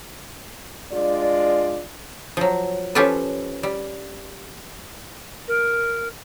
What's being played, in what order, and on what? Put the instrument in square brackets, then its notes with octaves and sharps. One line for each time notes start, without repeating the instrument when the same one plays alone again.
[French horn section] G#3 D4 F4 D5
[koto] F3 F#3
F3 C#4 F4 G4 A4 B4
G3
[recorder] A#4